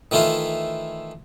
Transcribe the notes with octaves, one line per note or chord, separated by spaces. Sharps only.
D#3 E3 A3 E4 F4